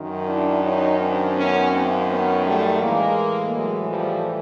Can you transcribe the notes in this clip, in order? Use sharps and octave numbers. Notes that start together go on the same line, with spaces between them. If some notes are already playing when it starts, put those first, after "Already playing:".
Already playing: F#2 D#3
D4 E4
C#4 D#4
C4 D4
B3 C#4
A#3 C4
B3 C#4
G3 A3
A2 E3 G#3 A#3
F#3 G#3
F3 G3